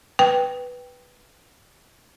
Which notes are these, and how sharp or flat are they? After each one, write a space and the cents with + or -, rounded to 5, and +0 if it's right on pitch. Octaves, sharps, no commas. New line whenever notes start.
B4 +0 G5 +0